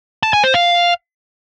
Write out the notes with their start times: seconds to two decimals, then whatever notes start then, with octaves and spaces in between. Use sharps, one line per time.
0.23 A5
0.33 G#5
0.44 C5
0.54 F5